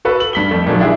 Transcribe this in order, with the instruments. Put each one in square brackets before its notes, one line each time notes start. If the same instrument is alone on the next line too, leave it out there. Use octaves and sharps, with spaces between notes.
[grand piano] F#4 A4 B4
F#7
G2 B6 G7
F2 A3
A#2 D#3 F3 F#3 G#3
D4 E4 G4 G#4